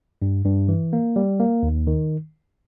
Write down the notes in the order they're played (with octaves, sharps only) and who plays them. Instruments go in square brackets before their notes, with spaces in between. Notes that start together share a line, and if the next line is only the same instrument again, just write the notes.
[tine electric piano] G2
G2
E3
A#3
G3
A#3
D#2
D#3